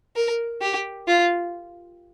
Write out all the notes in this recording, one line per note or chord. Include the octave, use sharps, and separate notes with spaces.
A#4
G4
F4